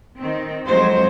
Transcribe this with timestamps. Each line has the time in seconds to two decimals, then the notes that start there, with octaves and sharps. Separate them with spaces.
0.19 D#3 C4
0.66 F2 F#3 G#3 C5